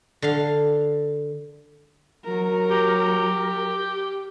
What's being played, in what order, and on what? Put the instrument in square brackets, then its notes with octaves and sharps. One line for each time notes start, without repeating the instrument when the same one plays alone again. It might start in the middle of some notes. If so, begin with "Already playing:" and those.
[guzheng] D3 F5
[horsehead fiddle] F#3 A#4
[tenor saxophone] G4